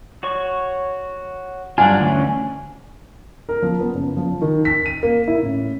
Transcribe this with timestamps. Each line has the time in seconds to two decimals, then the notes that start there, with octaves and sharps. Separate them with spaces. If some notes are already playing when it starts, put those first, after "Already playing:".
0.23 F#4 C#5 C#6
1.78 G2 F#3 D4 F4 F#5 G#5
2.01 D2 E3 C#4
3.49 A#4
3.62 F3
3.81 B3
3.94 F#1
4.17 F3
4.41 D#3
4.65 B6
4.86 D#7
5.03 A#3
5.28 E4
5.43 A1